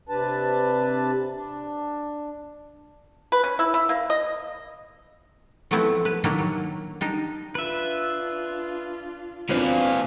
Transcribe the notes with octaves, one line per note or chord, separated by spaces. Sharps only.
C3 D4 B4 A5
D4
B4
C#4
E4
E4
A#3
D#5
F3 F#3 A3 B3 C4 E4
B4
D#3 F#3 G3 A#3 D4 E4
F#3
G3 D4 D#4
D4 F4 B4 E5
B2 F3 A#3 C4 D4 B4 F5